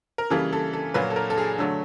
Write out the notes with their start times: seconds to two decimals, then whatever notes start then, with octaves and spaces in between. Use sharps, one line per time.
0.18 A#4
0.30 C#3 E3 G3 A#3 A4
0.53 A4
0.73 A4
0.94 A#2 F#3 A#3 B4
1.10 A4
1.16 A#4
1.30 A4
1.38 G#4
1.58 D3 F#3 A3